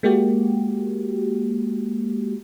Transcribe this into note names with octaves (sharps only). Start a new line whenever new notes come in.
G#3 A#3 F#4 G4